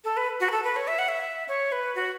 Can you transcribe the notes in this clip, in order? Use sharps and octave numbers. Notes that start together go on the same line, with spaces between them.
A4
B4
F#4
B4
A4
B4
C#5
E5
F#5
E5
C#5
B4
F#4